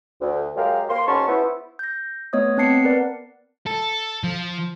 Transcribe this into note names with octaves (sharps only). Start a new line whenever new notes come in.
D2
F#2 G#3 G4 A#4 F5
A#3 C6
G#2 C#4 F#4 A5 B5 C#6
B3 E4 C5
G6 A#6
A3 B3 C#5 D#5 D#6
B3 C4 A5 C7 C#7
A#4 B4 D5 F#5
A4
F3